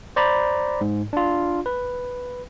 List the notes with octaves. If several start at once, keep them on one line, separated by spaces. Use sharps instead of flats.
C5 D5 A#5 B5
G#2
D4 F4
B4